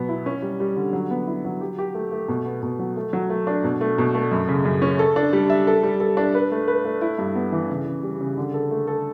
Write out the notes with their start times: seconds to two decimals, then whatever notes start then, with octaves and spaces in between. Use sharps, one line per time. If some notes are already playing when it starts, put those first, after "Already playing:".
Already playing: B2 F#3 B3
0.09 E4
0.26 C#4
0.42 G3
0.60 G3
0.77 D3
0.93 F#3
1.11 B3
1.27 E4
1.45 F#3
1.61 G4
1.78 G4
1.95 A3
2.12 A3
2.28 B2
2.45 B3
2.63 B2
2.79 F#3
2.97 A3
3.13 F#3
3.30 A3
3.47 D4
3.64 B2
3.81 A3
3.98 B2
4.15 A3
4.32 F#2
4.48 C#3
4.65 F#2
4.82 C#4
4.99 A4
5.16 D4
5.33 G3
5.50 E5
5.67 A4
5.83 G3
6.00 A4
6.17 D4
6.35 B4
6.52 A3
6.68 B4
6.85 A3
7.01 E4
7.18 G2
7.35 B3
7.52 E3
7.70 C#3
7.87 C#3
8.03 G3
8.21 C#3
8.38 D3
8.54 A4
8.71 A3
8.87 A4